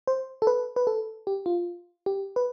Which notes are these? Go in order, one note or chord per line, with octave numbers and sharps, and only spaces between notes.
C5
A4
B4
B4
A4
G4
F4
G4
B4